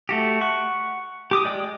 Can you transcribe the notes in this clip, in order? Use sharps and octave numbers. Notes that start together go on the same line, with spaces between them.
A3 F#4 G4
F#5 C#6
G4 D6 D#6
G#3 D5 G5